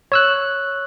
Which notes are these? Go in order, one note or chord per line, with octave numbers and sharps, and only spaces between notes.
C#5 E6 F#6